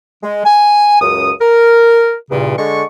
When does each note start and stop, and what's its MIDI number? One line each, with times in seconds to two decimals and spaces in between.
0.23 0.45 56
0.46 1.01 80
1.01 1.31 37
1.01 1.31 42
1.01 1.31 87
1.40 2.15 70
2.31 2.58 40
2.31 2.58 43
2.31 2.58 46
2.31 2.58 49
2.58 2.84 50
2.58 2.84 56
2.58 2.84 85